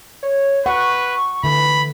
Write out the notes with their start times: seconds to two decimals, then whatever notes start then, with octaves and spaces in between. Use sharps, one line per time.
0.23 C#5
0.66 B4 F#5 C#6
1.44 D3 E3 B5